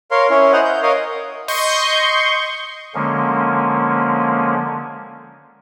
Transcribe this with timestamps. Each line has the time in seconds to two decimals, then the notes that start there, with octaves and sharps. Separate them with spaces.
0.11 A#4 C#5 F5 C6
0.30 C#4 E4 C#5
0.53 C5 D#5 F#5 A#5
0.64 G6
0.82 A#4 C#5 D#5 F5
1.48 D#5 C6 C#6 G6
2.95 D3 F3 G#3 A#3 C#4